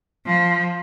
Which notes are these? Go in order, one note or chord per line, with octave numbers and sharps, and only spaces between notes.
F3